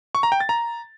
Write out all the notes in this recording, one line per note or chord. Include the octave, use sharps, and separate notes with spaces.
C#6
A#5
G5
A6
A#5